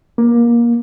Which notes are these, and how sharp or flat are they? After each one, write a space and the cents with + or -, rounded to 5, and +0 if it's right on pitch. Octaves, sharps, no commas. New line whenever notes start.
A#3 +20